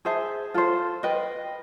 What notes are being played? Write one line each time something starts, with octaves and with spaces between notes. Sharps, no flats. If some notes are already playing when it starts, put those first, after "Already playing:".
G#4 C5 E5 A5
F4 A4 C5
B4 D#5 G5